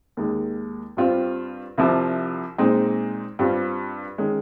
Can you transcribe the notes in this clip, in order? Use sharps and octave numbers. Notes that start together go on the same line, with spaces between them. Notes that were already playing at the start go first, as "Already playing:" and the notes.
D#2 D#3 G#3
G2 G3 C4 F4
C2 C3 F3
A#2 G#3 C4 D#4
G2 G3 C4 F4
D#3 G#3 C#4